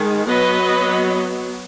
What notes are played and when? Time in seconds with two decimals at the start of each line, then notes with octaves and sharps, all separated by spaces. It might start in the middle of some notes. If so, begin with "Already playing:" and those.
Already playing: D#3 G#3
0.27 F#3 B3 B4 D#5